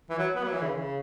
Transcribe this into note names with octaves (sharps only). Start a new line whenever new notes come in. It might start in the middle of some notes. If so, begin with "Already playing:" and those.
E3
F#3
B3
F#3
E3
C#3
E3
C#3